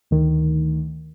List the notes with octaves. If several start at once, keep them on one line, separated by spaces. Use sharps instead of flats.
D2 D#3